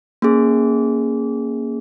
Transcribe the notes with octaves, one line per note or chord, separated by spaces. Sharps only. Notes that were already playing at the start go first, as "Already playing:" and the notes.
A#3 C#4 G#4